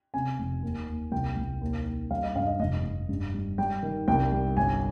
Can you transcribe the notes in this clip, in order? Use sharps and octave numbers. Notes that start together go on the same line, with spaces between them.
C3 G#5
F1
D#2
D#2
C2 G5
C2
D#2
D#2
G3 F5
D#5
G2 F5
D#5
F1 D#5
F1
G2
G3
G3 G5
D#3
C2 G5
G3
G1 G#5